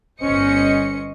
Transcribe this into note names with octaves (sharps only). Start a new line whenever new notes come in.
G1 C#4 C5 D#5 C#7